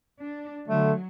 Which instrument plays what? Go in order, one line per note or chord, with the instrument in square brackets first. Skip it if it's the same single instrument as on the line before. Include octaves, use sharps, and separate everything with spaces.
[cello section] D4
[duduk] D3 [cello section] F#3 [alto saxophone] A3